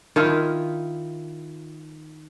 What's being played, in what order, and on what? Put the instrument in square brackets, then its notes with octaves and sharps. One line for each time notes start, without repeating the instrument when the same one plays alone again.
[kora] D#3 E4 F4